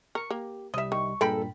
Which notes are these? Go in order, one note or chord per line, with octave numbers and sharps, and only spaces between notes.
A#4 C#6 C#7
A#3 G4
C2 G3 D#5 E5
D#3 C#6
G2 A#2 G#3 A4 A#4 G5 B5